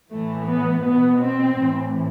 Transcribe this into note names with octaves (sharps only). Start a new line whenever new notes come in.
A2 E3 A3
B3
B2 B3
C4
A2 E3